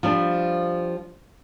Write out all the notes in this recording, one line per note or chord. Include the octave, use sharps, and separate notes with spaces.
F3 G3 D4